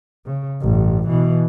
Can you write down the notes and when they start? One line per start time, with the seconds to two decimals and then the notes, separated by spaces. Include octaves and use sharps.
0.26 C#3
0.61 A1 G2
1.08 B2 E3